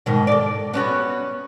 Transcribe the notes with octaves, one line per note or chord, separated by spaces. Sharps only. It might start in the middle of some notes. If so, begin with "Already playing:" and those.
G#2 B2 D#3
A4 D5
B3 C#4 F#4